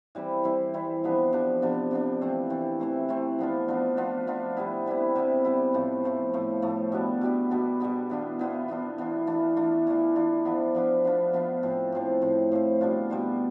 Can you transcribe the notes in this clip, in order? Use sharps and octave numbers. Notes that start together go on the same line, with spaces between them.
E3 G3 C4 E4
E3 G3 C4 E4
E3 G3 C4 E4
C3 F3 B3 D4
C3 F3 B3 D4
C3 F3 B3 D4
C3 F3 B3 D4
E3 A3 C4
E3 A3 C4
E3 A3 C4
E3 A3 C4
F3 B3 D4 F4
F3 B3 D4 F4
F3 B3 D4 F4
F3 B3 D4 F4
C3 G3 B3 E4
C3 G3 B3 E4
C3 G3 B3 E4
C3 G3 B3 E4
A2 F3 A3
A2 F3 A3
A2 F3 A3
A2 F3 A3
B2 G3 B3 D4
B2 G3 B3 D4
B2 G3 B3 D4
B2 G3 B3 D4
E3 B3 D4 F4
E3 B3 D4 F4
E3 B3 D4 F4
E3 B3 D4 F4
E3 A3 D4 F4
E3 A3 D4 F4
E3 A3 D4 F4
E3 A3 D4 F4
F3 B3 D4 F4
F3 B3 D4 F4
F3 B3 D4 F4
F3 B3 D4 F4
A2 F3 C4
A2 F3 C4
A2 F3 C4
A2 F3 C4
B2 G3 D4 F4
B2 G3 D4 F4